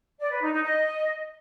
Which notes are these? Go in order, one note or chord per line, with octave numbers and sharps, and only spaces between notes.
D5
B4
D#4
D#4
D#5